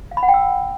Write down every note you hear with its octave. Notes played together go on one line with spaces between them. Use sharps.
F5
B5
F#5
G5
E6